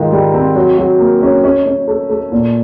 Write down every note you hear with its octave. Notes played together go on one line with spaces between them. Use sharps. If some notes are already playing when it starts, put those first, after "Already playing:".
Already playing: G#2 D#3 F4
G3
C4
F#3
F#3
A#3
C#4
C#4
C#4
A3
A3
A#2